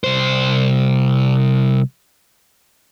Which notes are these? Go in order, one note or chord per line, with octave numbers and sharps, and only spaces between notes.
C2 C5